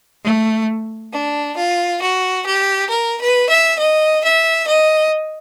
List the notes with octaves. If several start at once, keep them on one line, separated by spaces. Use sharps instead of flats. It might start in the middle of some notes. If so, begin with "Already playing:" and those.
A3
D4
F4
F#4
G4
A#4
B4
E5
D#5
E5
D#5